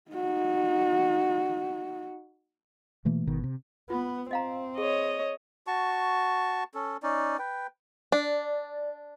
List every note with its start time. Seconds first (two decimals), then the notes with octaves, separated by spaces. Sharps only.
0.11 D#4 F#4
3.05 B2 E3 A3 A#3
3.27 G#1 B2 D#3
3.44 C3
3.90 B3 F4
4.31 C4 D#5 F5 A#5
4.78 G#4 C#5 D#5
5.67 F#4 A5 C#6
6.74 C#4 A4
7.03 C#4 D#4 D5
7.39 B4 G5
8.12 D4 D5